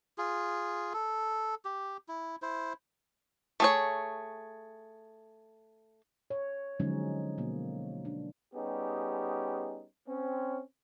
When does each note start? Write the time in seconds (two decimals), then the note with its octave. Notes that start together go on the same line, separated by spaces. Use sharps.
0.18 F4 G#4
0.93 A4
1.65 G4
2.08 E4
2.42 E4 C5
3.60 A3 G#4 C#5
6.30 C#5
6.80 D3 F3 F#3 G#3 C#4 D#4
7.38 B2 A#3
8.05 D4
8.54 G3 B3 C#4 D#4 G4 G#4
10.07 C4 C#4